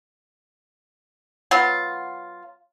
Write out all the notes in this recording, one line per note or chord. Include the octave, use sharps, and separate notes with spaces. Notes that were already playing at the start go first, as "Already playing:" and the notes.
F#3 B3 F4